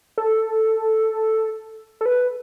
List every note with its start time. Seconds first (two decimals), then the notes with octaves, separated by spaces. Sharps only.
0.18 A4
2.01 A4
2.06 B4